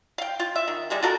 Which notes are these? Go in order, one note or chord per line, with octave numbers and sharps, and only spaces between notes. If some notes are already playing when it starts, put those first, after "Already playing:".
F5 G5
F4
E5
D#3
G3 G#3 G#4
F4 F#4 A4 A#4